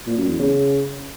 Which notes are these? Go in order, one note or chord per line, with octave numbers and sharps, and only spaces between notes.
A#2
F#2
E2
C#3